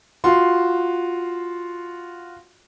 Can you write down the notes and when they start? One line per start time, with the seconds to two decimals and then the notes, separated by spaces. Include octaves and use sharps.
0.24 F4 F#4 C6